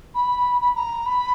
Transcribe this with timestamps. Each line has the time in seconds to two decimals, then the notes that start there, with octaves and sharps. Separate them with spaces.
0.15 B5
0.61 B5
0.75 A#5
1.06 B5